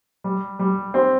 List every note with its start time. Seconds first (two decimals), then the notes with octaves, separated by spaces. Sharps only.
0.24 G3
0.59 G3
0.94 C4